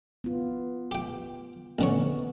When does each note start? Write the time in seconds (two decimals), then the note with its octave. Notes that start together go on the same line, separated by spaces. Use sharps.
0.24 B3 F4
0.91 G4 G5
1.79 A1 D3 B3 C#5